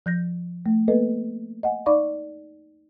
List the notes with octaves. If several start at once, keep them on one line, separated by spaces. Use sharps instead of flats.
F3 G6 A#6
A3
A#3 B3 A4 B4 D#5
D#5 F#5 G#5
D#4 D5 F5 B5 C#6 D6